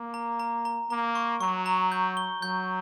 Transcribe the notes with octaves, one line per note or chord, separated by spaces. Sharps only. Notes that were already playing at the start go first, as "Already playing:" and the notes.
Already playing: A#3
A#5
A#5
A#5
A#3 A#5
C#6
F#3 C#6
A#5
G6
G7
F#3 G6